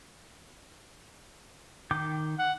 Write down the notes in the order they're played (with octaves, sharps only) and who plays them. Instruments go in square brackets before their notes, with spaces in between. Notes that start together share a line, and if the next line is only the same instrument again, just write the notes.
[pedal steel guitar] D#3 G5 D6
[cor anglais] F#5